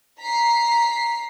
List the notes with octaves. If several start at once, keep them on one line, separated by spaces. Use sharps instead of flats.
A#5 B6 C7